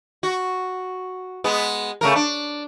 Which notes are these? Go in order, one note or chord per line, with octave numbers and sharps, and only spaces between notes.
F#4
G#3 B3
C#3 A3 A#4
D4